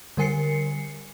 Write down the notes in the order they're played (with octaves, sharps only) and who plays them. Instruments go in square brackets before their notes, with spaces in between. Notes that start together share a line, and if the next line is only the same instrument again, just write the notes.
[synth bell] D3 G3 A#4 G#5 C7 C#7